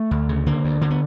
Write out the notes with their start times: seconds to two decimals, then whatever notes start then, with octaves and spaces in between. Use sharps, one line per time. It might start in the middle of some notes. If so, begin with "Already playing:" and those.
Already playing: A3
0.11 D2
0.29 C#3
0.46 D3 A#3
0.64 D2
0.81 D3 A#3
0.91 B3